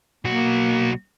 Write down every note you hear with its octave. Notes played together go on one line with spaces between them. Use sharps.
B1 A#3 F#4